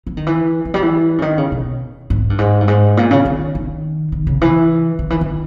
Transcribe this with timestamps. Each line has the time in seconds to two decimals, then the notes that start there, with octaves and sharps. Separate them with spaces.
0.07 E3
0.17 D#3
0.27 E3
0.65 E3
0.74 G3
0.82 E3
1.18 C#3
1.22 D#3
1.38 C#3
1.52 B2
2.10 G#2
2.30 G2
2.38 G#2
2.61 G2
2.68 G#2
2.97 A#2
3.11 C#3
3.25 D#3
3.55 D#3
4.12 D#3
4.27 C#3
4.41 E3
4.99 D#3
5.10 E3
5.21 D#3